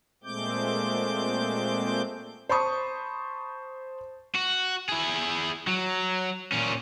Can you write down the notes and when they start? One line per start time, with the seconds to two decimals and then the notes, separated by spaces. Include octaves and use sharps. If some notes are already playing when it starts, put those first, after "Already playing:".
0.24 A#2 G#3 A3 C4 D6 G6
2.49 C5 A5 B5 C#6 D#6
4.35 F#4
4.89 E4 G#4
5.67 F#3
6.52 A#2 C#4